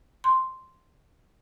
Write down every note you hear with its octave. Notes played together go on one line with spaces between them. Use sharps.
C6